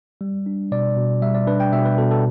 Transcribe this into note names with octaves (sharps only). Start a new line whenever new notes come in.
G3
D4
B2 D5
B2
G3 E5
D5
D4 B4
G5
B2 E5
B4
B2 A4
A4